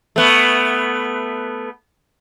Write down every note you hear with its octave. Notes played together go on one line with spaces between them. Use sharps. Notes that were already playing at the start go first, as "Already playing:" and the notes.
A3 B3